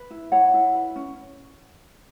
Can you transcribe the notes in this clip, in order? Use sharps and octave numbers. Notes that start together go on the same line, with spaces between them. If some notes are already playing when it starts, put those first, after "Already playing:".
Already playing: B4
E4
E4 C#5 F#5
E4
B4
C#4